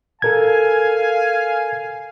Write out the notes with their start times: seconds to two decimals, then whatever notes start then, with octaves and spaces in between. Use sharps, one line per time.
0.22 A4 A#4 F5 G#5 G#6